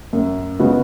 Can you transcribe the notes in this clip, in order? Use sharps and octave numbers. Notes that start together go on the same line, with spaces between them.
F#2
C#3 G#3 B3 F#4